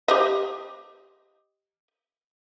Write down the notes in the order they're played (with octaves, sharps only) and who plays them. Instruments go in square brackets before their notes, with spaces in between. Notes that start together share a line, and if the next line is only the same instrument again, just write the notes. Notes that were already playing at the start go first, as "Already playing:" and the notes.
[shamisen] G4 C5 D#5